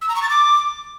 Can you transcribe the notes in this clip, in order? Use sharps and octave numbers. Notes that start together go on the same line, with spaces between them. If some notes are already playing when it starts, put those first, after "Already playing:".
E6
A#5
C#6
A6
D6